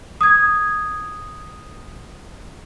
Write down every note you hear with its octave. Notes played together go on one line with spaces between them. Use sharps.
D#6 G#6